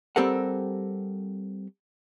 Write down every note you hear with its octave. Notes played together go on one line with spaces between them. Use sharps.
G3 C4 G4 A4 A#4 F#5